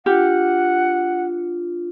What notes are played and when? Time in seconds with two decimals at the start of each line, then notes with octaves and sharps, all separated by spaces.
0.06 D4 F4 G4 F#5